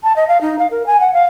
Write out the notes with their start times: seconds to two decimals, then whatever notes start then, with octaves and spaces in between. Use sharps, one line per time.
0.03 A5
0.16 D#5
0.28 F5
0.41 D#4
0.59 F5
0.71 A#4
0.86 G#5
1.00 F#5
1.13 F5